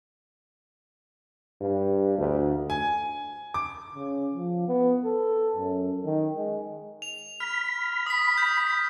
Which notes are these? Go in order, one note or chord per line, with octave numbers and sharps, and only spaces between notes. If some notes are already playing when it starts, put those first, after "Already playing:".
G2
D2
G#5
D6
C#3
F3
B3
A4
F#2
D#3
G#3
F7
B5 F6
D#6 B6
G6